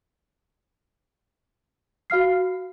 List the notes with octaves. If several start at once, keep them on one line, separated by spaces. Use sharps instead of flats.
F#4 F5 F6 C7